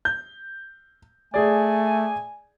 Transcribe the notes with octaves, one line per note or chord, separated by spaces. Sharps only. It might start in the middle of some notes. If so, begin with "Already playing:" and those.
G6
A3 G#4 D5 G#5